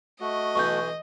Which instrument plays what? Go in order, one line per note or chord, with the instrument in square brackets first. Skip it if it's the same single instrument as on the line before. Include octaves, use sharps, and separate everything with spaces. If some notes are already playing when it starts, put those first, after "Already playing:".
[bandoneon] A3 F#4 [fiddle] D#5
[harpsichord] B1 E3 [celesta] C#6 G6